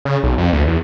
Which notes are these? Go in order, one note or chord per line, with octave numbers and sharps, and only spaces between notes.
C#3
B1
F2
D2
E2